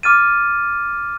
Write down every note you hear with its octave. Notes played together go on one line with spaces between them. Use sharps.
D6 F6 A6 D#7